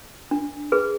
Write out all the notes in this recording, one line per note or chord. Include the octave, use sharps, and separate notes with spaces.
D4
G#4 B4